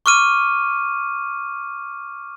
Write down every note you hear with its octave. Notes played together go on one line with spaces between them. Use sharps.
C#6 D6 F6 D#7